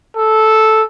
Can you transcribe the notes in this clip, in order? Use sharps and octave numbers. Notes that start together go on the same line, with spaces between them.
A4